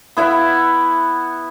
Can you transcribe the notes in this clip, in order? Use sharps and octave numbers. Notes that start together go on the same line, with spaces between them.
B3 E4 E5 F#5